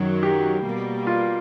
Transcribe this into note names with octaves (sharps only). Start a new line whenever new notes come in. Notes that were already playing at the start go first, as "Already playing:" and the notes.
Already playing: F#2 D#3 F#3
G4
B2 G3 A#3
F4